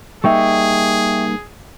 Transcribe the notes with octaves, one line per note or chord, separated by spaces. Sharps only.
G3 A#3 D#4 G#4 E5 G5 C#6